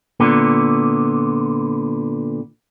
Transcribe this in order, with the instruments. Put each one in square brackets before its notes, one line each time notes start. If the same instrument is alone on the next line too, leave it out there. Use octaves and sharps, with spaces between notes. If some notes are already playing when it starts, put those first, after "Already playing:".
[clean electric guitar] A#2 D3 B3